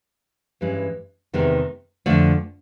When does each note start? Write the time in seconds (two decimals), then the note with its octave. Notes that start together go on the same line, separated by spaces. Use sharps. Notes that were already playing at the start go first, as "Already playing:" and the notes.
0.61 G2 E3 G#3 C#4
1.33 E2 C3 D#3 G#3 B3
2.06 F2 D3 F3 A3